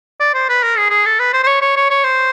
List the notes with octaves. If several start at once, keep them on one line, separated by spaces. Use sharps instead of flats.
D5
C5
B4
A#4
G#4
G#4
A4
B4
C5
C5
C#5
C#5
C#5
C#5
C5